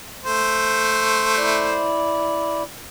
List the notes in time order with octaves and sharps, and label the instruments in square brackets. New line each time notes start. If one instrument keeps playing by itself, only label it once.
[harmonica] A3 C5
[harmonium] E4 D5